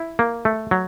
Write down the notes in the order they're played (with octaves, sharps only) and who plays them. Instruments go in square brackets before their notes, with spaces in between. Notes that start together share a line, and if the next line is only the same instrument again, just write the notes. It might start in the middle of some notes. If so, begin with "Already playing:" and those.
Already playing: [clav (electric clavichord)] E4
A#3
A3
F#3